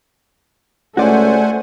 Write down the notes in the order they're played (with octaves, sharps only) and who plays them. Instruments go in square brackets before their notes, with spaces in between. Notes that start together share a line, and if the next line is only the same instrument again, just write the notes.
[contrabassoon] C#2 [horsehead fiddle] A3 [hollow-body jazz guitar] F#4 D5 [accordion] C5 F#5 G#5